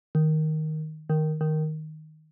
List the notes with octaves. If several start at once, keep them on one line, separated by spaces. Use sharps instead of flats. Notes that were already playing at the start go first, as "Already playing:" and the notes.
D#3
D#3
D#3